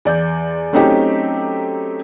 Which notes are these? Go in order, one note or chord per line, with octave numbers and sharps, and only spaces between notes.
E2 D5 G6
F#3 A3 C4 C#4 D#4 G4